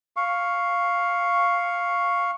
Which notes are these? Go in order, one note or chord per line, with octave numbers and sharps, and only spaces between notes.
F5 C#6